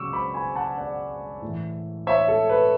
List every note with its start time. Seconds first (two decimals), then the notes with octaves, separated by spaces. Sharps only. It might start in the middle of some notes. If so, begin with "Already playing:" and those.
Already playing: C#3 F#3 C#6 D6 E6
0.13 B5 D6
0.34 G#5 B5
0.56 F#5 A5
0.78 D5 F#5
1.42 A2 E3
2.07 C#5 E5
2.28 A4
2.49 B4